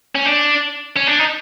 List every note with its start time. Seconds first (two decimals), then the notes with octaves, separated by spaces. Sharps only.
0.15 C#4
0.26 D4
0.97 C#4
1.07 D4
1.19 D#4